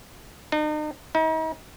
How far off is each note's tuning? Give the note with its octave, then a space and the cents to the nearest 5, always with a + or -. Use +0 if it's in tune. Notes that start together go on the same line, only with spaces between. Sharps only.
D#4 -40
D#4 +40